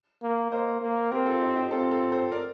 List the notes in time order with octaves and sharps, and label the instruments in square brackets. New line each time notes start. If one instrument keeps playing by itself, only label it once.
[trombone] A#3
[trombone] A#3 [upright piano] C5 D#5
[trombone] A#3
[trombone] C4 [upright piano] G4 A#4
[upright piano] F4 A4
D#4 G4
D#4 G4
[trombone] C4 [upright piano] F4 A4
[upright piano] F4 A4
A4 C5
A#4 D5